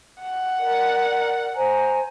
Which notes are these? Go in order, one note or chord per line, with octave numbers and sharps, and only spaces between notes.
F#5
A#4 D5
C5 G#5 A#5